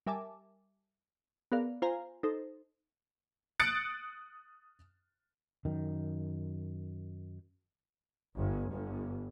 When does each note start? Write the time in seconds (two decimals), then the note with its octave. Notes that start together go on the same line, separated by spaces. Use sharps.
0.06 G3 A#4 E5 G#5 A5 D6
1.52 B3 G#4 A#4 D5 F5
1.82 F4 C5 F5 G#5 A#5
2.23 D#4 A4 C5
3.60 D#6 F#6 A6 C#7 D7
5.65 F#2 D#3
8.35 G1
8.70 G1